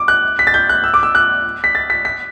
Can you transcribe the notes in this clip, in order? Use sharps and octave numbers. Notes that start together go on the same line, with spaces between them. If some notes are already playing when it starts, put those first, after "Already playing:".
Already playing: D6
F#6
B6
A6
G6
F#6
E6
D6
E6
F#6
B6
A6
B6
B6